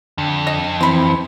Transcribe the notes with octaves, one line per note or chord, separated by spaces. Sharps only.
F2 D3
D#5
E3 C4 B4 B5 C6